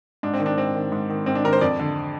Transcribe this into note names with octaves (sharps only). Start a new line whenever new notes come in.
G#2 D4
C4
D#3
D4
G#2 C4
D#3
G#2
D#3
G#2 C4
D4
D#3 A#4
C5
F2 D5
D3